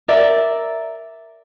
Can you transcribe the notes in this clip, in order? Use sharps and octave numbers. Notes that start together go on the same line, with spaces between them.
A#4 D5 E5